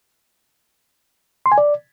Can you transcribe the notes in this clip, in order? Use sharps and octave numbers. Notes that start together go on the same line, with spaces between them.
C6
G#5
D5